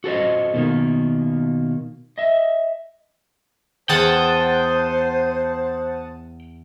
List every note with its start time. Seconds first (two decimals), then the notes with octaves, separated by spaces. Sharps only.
0.04 F#4 A4 C5 D#5
0.54 B2 D#3 A#3
2.18 D#5 E5
3.89 E2 C5 F#5 G5 A5 D#6